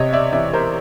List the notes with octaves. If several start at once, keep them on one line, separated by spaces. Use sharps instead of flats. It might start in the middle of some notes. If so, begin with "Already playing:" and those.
Already playing: C3 C#5 D#5
D5 E5
E3 D5 E5
A#4 C5